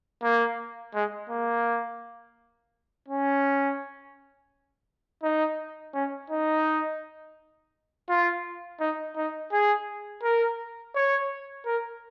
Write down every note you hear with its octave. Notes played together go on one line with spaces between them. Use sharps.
A#3
G#3
A#3
C#4
D#4
C#4
D#4
F4
D#4
D#4
G#4
A#4
C#5
A#4